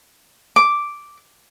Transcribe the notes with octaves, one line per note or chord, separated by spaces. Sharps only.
D6